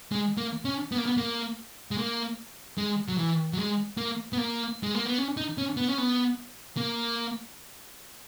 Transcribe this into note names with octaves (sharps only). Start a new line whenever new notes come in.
G#3
A#3
C#4
B3
A#3
B3
A#3
G#3
A#3
G#3
F#3
E3
F#3
G#3
A#3
B3
A#3
G#3
A#3
B3
C#4
D#4
C#4
B3
C#4
B3
A#3